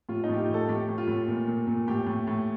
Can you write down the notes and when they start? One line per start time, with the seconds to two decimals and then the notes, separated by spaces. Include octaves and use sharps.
0.09 A2 F4
0.24 D#4
0.29 A2 G4
0.38 F4
0.49 A2 A4
0.69 A2 G4
0.89 A2
0.98 F4
1.07 A2
1.28 A#2
1.47 A#2
1.67 A#2
1.88 A2 G4
2.07 A2
2.27 A2